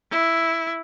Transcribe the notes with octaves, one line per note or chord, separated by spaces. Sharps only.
E4